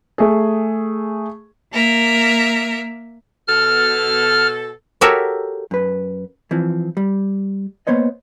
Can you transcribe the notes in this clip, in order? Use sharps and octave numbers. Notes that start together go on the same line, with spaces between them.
A3 G#4
A#3 A#4 E5
B2 A4 F6
F#4 G4 A4 A#4 C#5 E5
F#2 B4
E3 F3 C4
G3
A#3 B3 C5 C#5 D#5